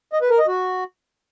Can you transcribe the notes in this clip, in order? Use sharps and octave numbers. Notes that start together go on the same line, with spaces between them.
D#5
B4
A#4
D#5
F#4